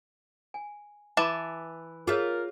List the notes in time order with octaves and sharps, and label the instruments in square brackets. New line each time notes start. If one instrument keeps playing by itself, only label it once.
[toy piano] G#5
[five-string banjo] E3 A5 [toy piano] C6 D6
[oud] F4 E5 [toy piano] G#4 C#5 [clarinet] A#4